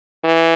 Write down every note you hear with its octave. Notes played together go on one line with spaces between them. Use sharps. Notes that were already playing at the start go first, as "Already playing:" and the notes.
E3